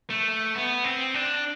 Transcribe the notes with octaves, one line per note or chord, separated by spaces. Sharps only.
A3
B3
C4
D4